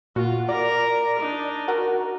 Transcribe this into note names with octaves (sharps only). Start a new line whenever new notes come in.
A#2 F4 F#4
A#4 D5 A#5
D4 D#4
F#4 A#4